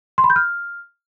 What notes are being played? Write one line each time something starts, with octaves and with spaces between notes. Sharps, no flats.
C6
B5
G6
F6